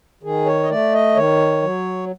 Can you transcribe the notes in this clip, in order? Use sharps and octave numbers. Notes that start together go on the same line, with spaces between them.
D#3 G#4
C#5
D#5
A3 D5
D#5
D#3 C#5
F#3